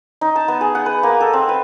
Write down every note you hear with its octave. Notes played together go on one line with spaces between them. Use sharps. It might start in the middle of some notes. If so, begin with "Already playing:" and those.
D#4
A5
B3
G#4
F#5
B4
A#3
A4
C4
B4